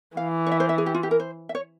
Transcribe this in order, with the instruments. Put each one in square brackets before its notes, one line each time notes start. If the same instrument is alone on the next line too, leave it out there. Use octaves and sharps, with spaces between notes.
[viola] E3 [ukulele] F5
[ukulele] C#5
E5
C5
E5
G#4
G4
F4
G4
A#4
C5
E5
C#5